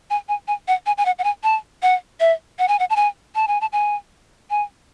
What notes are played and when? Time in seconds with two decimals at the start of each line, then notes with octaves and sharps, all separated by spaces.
0.10 G#5
0.29 G#5
0.48 G#5
0.68 F#5
0.86 G#5
0.98 G#5
1.06 F#5
1.19 F#5
1.24 G#5
1.44 A5
1.83 F#5
2.20 E5
2.59 F#5
2.68 G#5
2.79 F#5
2.90 A5
2.96 G#5
3.35 A5
3.48 G#5
3.61 A5
3.73 G#5
4.50 G#5